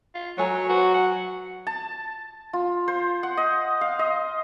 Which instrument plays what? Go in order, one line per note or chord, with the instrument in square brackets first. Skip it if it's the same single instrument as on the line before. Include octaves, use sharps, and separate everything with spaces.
[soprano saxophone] F4
[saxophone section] F#3 [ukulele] A4 G#5 A#5 [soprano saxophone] C#5
[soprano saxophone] F#4 [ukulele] B4 C5
[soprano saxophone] F#5 [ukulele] G#5
[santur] A5
F4
C5
F#5
D#5
F5
D#5